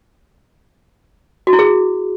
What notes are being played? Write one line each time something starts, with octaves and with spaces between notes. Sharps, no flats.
F#4
E4
G#4